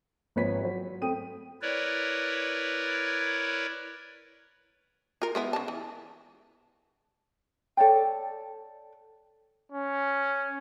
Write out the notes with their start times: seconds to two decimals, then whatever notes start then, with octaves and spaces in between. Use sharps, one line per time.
0.36 G#1 F3 B4 C#5 B6
0.61 F#3 F#4 C5
1.02 A3 C4 G5 D#6 D#7
1.62 E4 A#4 B4 C#5 D5
5.22 F4 A#4
5.35 G#3 B3 E4
5.53 C#3 B3 A5
5.68 E3
7.77 A4 C#5 D5 G5
9.72 C#4